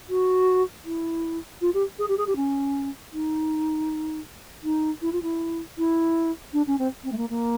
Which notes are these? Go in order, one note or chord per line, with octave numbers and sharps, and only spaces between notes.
F#4
E4
F4
G4
G#4
G4
G#4
G4
C#4
D#4
D#4
E4
F4
E4
E4
D4
C#4
C4
C4
A3
A#3
A#3